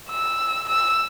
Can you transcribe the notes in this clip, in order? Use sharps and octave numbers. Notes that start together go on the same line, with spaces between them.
E6
E6